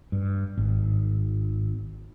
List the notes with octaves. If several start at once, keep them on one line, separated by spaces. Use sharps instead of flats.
G2
G#1